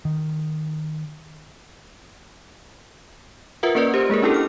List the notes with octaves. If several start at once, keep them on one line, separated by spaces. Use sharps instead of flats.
D#3
F4 A#4 B4 E5 F#5
A#3 C#4 A#4 B4 D5
G4 C5
G#3 A#3 G#4 A#4
C#4 D4 E4 G4 A4
F6